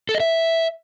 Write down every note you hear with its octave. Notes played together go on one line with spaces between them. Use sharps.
A4
D#5
E5